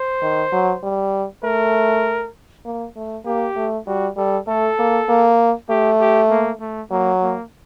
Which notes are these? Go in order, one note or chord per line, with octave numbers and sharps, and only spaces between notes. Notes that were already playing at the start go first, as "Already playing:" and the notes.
Already playing: C5
D#3
F#3
G3
A3 A#4
A#3
A3
A#3 G4
A3
G3 F#4
G3 A4
A3 A4
A#3
A#3
A3 G4
G4
A#3
A3
F#3 A#3
A#3